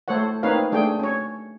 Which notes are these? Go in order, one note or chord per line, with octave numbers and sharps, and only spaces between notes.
A3 A4 C5 C#5 F#5
A#3 C4 D#4 B4 C#5 F5
A3 D4 G#4 G5
C#4 C#5